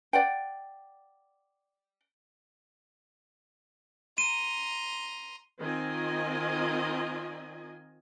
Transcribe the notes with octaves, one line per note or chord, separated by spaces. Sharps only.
D5 F#5 G5
A#5 C6 D#7
D#3 C4 F4 D#5 G#5